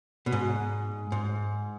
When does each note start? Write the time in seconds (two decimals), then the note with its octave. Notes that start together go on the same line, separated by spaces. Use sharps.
0.26 B2
0.32 G#2
1.12 G#2